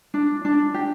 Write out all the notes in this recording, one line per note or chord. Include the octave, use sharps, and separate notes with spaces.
D4
D4
G4